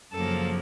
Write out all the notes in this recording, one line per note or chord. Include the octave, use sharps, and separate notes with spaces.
F#2 C#3 F3 A#3 A4